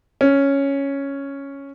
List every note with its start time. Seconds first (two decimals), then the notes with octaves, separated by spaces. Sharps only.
0.21 C#4